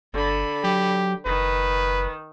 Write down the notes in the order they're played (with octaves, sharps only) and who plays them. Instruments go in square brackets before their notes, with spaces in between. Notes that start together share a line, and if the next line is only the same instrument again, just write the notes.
[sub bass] G1 [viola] D3 B5
[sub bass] F#3 [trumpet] G4
[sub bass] F#1 [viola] D#3 [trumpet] B4